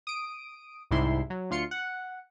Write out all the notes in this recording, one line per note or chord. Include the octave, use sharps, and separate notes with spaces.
D#6 D7
C2 G#2 C3 E4 C6
F#3
D2 F4 C6 C#7
F#5